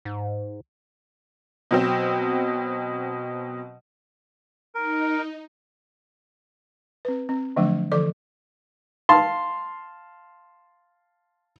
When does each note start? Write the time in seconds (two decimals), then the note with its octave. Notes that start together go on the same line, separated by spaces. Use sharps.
0.05 G#2
1.71 B2 F#3 C4
4.75 D#4 A#4
7.05 C4 B4
7.29 C4
7.56 D3 F3 F#3 A3 D4
7.92 D3 E3 F3 A4 D5 D6
9.09 F5 A5 C6